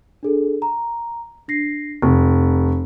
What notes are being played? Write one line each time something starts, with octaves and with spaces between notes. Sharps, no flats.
D4 G#4 A4
A#5
D4 A#6 C7
F1 C#6